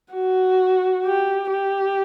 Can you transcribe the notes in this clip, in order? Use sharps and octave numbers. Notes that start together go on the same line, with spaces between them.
F#4
G4
G4